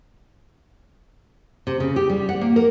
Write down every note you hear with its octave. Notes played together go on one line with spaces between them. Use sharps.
C3
C#3
G4
G3
F#5
A#3
A#4